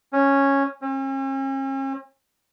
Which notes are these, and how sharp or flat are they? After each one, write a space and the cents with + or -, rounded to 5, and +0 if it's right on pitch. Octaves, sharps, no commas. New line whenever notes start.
C#4 -5
C#4 -45